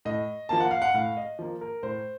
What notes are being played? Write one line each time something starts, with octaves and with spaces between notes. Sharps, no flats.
A2 D#5
F3 A#3 A5
F#5
F5
F#5
A2 F5
D#5
F3 A#3
A#4
A2 C5